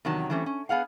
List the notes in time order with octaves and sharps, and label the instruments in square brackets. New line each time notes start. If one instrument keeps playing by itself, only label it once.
[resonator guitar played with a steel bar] E2 C3 D#3 F#3 A5
E3 G3 A3 C4 C#4
C#4
B3 G#4 F5 F#5